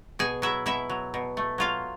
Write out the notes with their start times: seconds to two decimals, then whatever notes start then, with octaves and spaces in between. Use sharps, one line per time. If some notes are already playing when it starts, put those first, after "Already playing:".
0.19 B2 G#4 G#5
0.42 F#3 E4 E5
0.66 B2 E4 E5
0.89 F#3
1.14 B2
1.37 A3
1.58 F#3 F4 F5